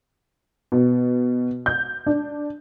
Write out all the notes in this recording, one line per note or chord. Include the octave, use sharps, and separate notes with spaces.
B2
G6
D4